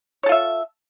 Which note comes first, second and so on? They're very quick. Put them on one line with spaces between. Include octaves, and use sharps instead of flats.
C#5 A4 F4 E5